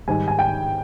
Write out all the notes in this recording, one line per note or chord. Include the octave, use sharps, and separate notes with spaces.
G#2 D#3 G3 G#5
G#5
G5